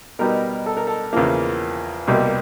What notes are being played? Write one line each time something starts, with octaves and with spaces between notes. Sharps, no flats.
B2 G3 B3 D#4 A#4
A4
A#4
A4
E2 C#3 F3 A#3
C2 B2 G3 A#3